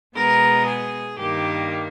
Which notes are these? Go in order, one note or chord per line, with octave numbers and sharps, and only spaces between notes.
B2 G#3 B3 A#4
G#4
G2 D#3 G3 A#3 G4